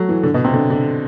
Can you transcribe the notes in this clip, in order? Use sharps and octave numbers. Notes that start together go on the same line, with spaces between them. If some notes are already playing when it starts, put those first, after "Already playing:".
Already playing: F#3 A3
E3
D3
B2
C3
D3
D3